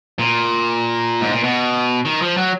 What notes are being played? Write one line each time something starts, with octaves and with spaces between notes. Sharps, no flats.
A#2
G#2
A#2
B2
D#3
F3
F#3